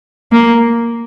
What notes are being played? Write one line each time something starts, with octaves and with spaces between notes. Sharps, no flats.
A#3